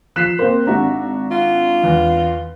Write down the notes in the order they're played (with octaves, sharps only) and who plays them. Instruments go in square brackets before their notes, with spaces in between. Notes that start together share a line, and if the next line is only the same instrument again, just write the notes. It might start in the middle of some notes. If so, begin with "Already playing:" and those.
[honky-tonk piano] F3 E7 [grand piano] F#6 B6 C7
[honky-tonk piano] A#3 C4 [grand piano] C5
[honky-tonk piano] G#1 D4 [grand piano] F#4 E5 A#5
[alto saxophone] F4
[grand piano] E2